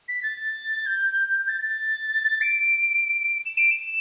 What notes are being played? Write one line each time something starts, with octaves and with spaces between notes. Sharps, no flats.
B6
A6
G6
A6
A6
D7
E7
D7
E7